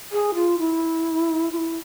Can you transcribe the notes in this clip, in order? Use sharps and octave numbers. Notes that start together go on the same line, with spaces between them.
G#4
F4
E4
F4
E4